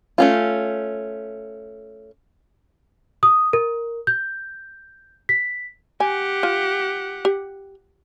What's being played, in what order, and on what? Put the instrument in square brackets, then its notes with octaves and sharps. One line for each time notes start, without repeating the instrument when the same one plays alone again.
[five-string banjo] A3 C#4 F4
[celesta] D#6
A#4
G6
B6
[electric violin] G4 F#5 [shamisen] G#5
[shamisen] F4
G4